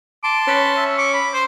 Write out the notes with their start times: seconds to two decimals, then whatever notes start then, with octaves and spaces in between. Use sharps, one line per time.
0.24 A5 C6 D6
0.48 C#4 B4
0.77 E5
0.98 C#6 D6
1.14 B5
1.34 C5